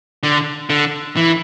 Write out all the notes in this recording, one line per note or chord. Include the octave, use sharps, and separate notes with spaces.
D3
D3
E3